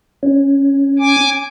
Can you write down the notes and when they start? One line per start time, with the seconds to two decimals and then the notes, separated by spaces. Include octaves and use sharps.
0.23 C#4
0.99 G#5 D6